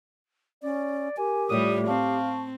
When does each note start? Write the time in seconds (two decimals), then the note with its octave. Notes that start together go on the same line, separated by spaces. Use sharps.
0.63 C#4 D5
1.17 G4 A#4 G#5
1.50 A2 G3 F4 C#5 D5 D#6
1.87 C4 F5 A5 C#6